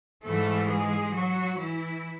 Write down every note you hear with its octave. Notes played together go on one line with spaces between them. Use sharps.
G#2 E3 G3 A3 A4
G#3 G#4
F#3 F#4
E3 E4